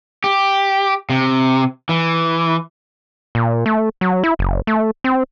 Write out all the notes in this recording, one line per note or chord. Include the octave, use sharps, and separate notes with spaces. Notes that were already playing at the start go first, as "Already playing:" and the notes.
G4
C3
E3
A#2
A3
F#3
E4
F#1
A3
C4